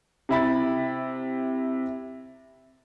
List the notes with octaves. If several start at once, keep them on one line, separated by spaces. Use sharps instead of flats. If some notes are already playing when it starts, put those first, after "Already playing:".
C3 E4 B5 A6